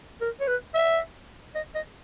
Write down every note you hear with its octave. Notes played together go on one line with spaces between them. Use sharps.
A#4
C#5
B4
E5
D#5
D#5